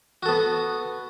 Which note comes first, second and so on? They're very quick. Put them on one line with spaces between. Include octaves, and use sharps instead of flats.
F#4 A4 B3